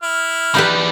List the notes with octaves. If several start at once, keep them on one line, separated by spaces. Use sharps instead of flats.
E4 F6
E3 D#4 G4 B4 D5